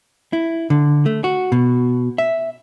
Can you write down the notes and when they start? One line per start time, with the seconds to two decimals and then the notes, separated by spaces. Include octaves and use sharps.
0.33 E4
0.70 D3
1.06 A3
1.24 F#4
1.52 B2
2.18 E5